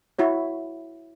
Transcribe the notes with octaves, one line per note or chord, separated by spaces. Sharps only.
E4 F#4 C#5